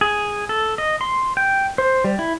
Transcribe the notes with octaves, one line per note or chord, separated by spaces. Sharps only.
G#4
A4
D#5
C6
G5
C5
G3
E4